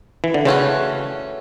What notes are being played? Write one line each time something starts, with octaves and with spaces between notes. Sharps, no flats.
E3
D3
C#3 E3 A3 C#4 F#4